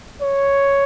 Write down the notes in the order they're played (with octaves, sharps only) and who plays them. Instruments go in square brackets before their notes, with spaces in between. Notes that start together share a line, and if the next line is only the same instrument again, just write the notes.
[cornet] C#5